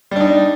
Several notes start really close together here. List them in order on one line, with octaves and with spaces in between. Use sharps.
G3 D4 D#4